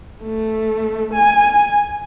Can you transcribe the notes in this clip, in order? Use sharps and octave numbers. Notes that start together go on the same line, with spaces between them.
A3
G#5